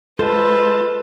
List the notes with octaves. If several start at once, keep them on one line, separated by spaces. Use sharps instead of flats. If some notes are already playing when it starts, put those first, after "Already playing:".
G#3 F4 A4 B4 C5 A5